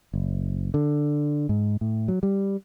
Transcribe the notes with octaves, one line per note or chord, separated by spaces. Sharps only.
F#1
D3
G#2
A2
F#3
G3